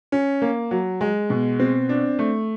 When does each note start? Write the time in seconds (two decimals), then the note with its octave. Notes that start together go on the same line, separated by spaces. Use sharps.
0.12 C#4
0.42 A#3
0.71 F#3
1.01 G#3
1.30 B2
1.60 C4
1.89 D4
2.19 A3